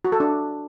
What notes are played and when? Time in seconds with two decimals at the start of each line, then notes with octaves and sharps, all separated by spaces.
0.05 F#4
0.12 A4
0.20 D4